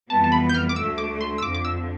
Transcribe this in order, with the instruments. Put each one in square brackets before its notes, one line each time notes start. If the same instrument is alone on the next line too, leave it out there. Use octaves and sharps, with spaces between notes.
[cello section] F2 E3 G3 B3 [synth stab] A5
[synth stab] A5
B5
G6
F6
D6
[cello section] D2 D3 A3 [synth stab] E6
[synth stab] D6
C6
E6
[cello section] F2 D3 F3 [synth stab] D6
[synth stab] D6
E6